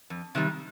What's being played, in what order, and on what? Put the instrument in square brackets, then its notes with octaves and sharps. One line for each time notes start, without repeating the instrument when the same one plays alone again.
[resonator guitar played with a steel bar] F2
C3 D#3 G3